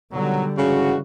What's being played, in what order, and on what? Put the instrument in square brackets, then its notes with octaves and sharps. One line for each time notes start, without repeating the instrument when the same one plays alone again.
[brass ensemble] B2 D#3 F#3 [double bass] D3 G3
[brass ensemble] G#2 E3 F#4 [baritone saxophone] C#3